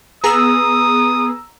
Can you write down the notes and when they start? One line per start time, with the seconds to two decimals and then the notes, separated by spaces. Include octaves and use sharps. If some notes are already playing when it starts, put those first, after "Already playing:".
0.24 B3 G#4 A#5 D#6 E6